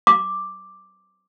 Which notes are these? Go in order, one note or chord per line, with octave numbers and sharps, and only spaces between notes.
D6